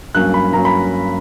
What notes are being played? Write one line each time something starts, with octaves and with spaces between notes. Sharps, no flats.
G2 F#3 A#3 C#4 F#6
B5
G2 F#3 A#3 C#4 A#5
B5